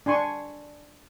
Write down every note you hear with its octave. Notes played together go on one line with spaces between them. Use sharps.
D4 G#5 C6 C#6